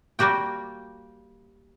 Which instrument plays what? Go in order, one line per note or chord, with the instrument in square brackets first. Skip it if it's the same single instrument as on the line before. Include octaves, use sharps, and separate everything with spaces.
[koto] G3 A#3 F#4 G4 G5